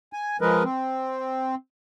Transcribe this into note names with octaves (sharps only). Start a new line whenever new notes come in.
G#5
F3 G#3 A#4 B4 D#5
C4